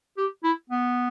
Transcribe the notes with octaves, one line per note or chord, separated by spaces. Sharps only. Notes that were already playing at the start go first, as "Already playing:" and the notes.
G4
E4
B3